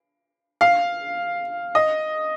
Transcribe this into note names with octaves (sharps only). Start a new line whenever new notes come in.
F5
D#5